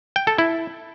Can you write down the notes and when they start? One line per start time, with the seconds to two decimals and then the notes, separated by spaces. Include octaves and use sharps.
0.16 G5
0.27 A4
0.38 E4